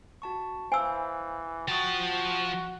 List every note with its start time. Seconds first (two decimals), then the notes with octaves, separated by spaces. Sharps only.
0.22 F#4 A5 C#6
0.72 E3 C5 F5 G#5 E6
1.68 F3 F#4 G5 A5 C#6 D#6